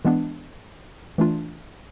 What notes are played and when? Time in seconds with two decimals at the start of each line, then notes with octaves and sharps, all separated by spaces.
0.05 E3 G#3 B3 D4
1.18 E3 A3 D4 F4